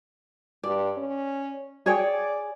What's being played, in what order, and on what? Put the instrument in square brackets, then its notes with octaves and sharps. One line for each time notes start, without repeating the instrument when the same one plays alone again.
[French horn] G2 [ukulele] D5
[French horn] C#4
[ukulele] G#4 C#5 G5 [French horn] D5